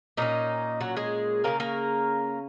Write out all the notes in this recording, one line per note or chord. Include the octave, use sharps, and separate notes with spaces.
A#2 A#3 C#4 D#4
F#3 F#4
G#3 G#4
C#3 G#3 A#3 C#4 A#4
A#3 A#4